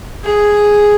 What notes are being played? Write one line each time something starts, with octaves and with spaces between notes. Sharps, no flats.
G#4